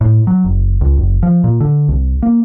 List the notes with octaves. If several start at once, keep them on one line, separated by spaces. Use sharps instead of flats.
A2
F#3
F#1
C#2
F#1
F3
A#2
D3
C2
A#3